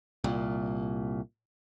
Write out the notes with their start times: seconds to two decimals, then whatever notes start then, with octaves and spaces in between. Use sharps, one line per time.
0.24 C2 A#2